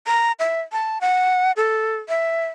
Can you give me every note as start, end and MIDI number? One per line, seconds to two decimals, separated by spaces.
0.07 0.32 82
0.39 0.60 76
0.72 0.98 81
1.01 1.52 78
1.57 1.96 69
2.09 2.46 76